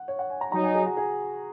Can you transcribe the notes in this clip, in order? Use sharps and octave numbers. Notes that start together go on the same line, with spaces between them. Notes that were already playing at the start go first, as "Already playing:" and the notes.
Already playing: F#5
C#5
F#5
G#5
A#5
F#3 D#4 A#5
G#5
G#4
F#4
G#4